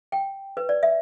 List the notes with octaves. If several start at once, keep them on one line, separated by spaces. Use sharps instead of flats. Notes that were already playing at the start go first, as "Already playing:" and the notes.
G5
B4
D5
E5